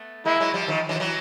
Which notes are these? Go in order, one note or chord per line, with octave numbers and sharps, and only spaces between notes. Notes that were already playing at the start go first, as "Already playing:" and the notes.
Already playing: A3 B3
G#3 A#3 E4
F#3 G#3
F3 G3
D#3 F3
E3 F#3
F3
E3 F#3